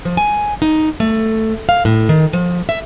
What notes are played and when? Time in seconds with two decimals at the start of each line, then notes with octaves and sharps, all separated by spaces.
0.05 F3
0.17 G#5
0.62 D#4
1.00 A3
1.69 F5
1.85 A2
2.09 D#3
2.33 F3
2.69 E5